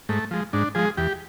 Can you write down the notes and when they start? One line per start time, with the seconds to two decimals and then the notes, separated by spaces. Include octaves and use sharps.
0.09 G#2 A3
0.31 F3 G#3
0.53 G#2 D4
0.75 F3 G#3 G#4
0.97 E2 G4